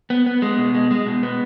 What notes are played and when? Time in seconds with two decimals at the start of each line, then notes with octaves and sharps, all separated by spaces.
0.10 B3
0.26 B3
0.42 G#3
0.58 B2
0.75 G#3
0.91 G#3
1.07 B2
1.23 B3